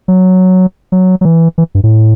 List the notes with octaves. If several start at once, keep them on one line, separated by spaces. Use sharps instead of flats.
F#3
F#3
F#3
E3
E3
G2
A2